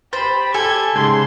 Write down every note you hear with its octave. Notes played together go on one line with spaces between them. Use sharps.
G4 C5 B5 A6
G4 A4 G#5 G#6
G#2 C#3 C6 G#6